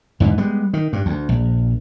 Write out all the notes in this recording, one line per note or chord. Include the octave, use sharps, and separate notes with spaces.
E2 G#2 D3 E3
G3 G#3 B3
D#3
G2
D2
A#1